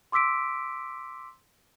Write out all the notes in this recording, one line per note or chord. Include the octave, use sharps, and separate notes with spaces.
C6 D6 E6 B6 D7